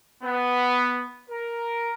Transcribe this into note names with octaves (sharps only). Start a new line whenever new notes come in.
B3
A#4